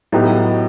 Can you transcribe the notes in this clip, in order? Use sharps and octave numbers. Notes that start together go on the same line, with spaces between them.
A2 F#3 B3 D#4 G4